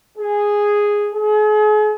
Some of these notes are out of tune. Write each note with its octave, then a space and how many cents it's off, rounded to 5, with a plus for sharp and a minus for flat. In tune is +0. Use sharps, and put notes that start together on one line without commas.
G#4 -5
G#4 +40